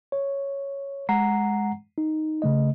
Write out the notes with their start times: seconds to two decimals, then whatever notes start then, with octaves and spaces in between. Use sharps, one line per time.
0.12 C#5
1.09 G#3 F#5 A#5 C7
1.98 D#4
2.42 C#3 A3 D#5